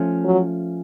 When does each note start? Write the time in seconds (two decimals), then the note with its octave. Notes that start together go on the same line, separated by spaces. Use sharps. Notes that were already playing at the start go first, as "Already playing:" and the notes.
Already playing: F3 A3 C#4
0.25 F#3